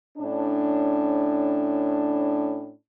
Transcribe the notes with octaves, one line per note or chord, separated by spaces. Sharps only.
A2 C#4 D4